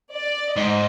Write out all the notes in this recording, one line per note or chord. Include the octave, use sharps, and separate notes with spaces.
D5
G#2 D#5